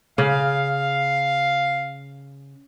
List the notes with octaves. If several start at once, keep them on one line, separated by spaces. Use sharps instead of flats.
C#3 F5